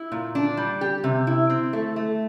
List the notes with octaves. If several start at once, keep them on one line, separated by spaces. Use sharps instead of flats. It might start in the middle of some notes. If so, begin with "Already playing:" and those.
Already playing: E4
A#2
D4
G3
G4
C3
E4
C4
A3
A3